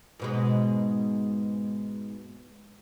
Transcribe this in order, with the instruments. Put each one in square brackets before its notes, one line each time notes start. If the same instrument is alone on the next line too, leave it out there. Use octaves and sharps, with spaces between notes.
[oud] G#2 B2 G#3